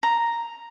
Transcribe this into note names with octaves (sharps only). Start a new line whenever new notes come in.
A#5